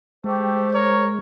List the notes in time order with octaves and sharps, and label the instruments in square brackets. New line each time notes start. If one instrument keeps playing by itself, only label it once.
[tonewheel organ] G#3 [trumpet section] A3 G4 [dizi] C5
[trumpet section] A#4 [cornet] C#5